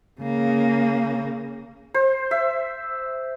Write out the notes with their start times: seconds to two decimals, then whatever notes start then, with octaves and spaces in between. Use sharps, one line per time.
0.21 C#3 A#3
1.94 C5
2.31 E5